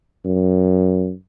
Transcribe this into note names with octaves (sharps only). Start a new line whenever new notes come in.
F#2